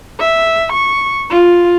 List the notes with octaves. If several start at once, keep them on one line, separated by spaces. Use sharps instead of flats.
E5
C#6
F4